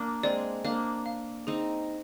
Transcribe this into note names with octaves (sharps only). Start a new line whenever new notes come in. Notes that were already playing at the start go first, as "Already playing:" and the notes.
Already playing: A#3 D4
G#3 C4 D5
A#3 D4 F5
F5
C4 D#4 G#4